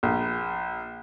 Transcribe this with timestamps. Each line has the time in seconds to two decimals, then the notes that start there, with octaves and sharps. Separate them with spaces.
0.03 A#1